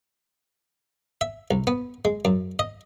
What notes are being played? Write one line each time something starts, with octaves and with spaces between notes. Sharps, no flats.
E5
C2
B3
G#3
F#2
D#5